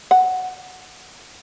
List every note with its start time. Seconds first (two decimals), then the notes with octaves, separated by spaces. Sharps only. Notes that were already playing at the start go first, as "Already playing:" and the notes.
0.11 F#5